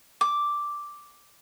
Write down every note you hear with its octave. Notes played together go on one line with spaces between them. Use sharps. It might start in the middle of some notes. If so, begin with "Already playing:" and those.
D6